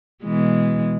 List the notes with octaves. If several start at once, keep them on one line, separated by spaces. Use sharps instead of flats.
B2 E3 G#3